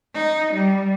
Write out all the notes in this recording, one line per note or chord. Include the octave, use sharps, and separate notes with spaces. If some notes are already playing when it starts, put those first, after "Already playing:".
D#4
G3